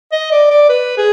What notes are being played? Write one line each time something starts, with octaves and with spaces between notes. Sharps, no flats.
D#5
D5
D5
B4
G#4